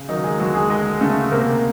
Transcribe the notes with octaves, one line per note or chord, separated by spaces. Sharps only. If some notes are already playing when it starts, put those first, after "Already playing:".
Already playing: C#3
D#3 F#3 D#4
G#3 G#4
D2 F#3 F#4
G#3 G#4
D2 G#3 G#4
C#3 A3 A4
C3 A#3 A#4